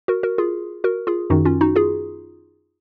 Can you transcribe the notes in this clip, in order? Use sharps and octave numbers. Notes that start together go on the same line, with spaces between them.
F#4 A#4
F#4 A#4
F4 G#4
F#4 A#4
F4 G#4
F#2 D#3 D#4 F#4
C#4 F4
D#4 F#4
F4 G#4